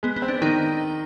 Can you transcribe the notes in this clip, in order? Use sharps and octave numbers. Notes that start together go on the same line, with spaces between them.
G#3 B3
B3
C4
D4
D#3 D#4